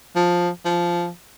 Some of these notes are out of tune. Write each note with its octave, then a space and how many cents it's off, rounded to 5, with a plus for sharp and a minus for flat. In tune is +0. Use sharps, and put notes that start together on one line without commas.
F3 +10
F3 -10